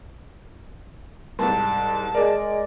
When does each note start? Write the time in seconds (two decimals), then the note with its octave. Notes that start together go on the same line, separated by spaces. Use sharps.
1.39 C2 G#2 A5
2.14 G#3 A#4 D5